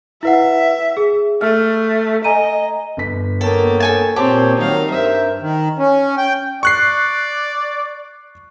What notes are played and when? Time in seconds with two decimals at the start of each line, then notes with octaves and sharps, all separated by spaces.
0.23 E4 B4 E5 F#5
0.97 G#4
1.41 A3 F6
2.24 D#5 G#5 A#5 D#7
2.97 G1 B6
3.41 A#3 B3 A4 C#5 G5
3.80 A4 G#5 A5
4.16 A#2 C4 G4 C5 C#5 A5 D6
4.57 D#3 F#3 G3 D#4 F5
4.90 G2 A#4 C5 E5
5.41 D#3
5.79 C#4
6.18 G5
6.63 D5 C#6 F#6 C7